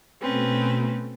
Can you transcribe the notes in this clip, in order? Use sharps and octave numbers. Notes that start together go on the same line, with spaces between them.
B2 A3 C4 C#4 B4